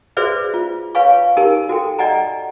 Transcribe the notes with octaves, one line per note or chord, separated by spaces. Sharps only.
F#4 G#4 B4 C5 D5 E5
F4
B4 C#5 F5 G#5 C#6
D#4 G4 A#4 G#5
F#4 A4 G5
D5 D#5 F#5 G#5 A#5